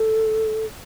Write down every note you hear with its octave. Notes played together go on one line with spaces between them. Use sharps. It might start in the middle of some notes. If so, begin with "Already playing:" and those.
Already playing: A4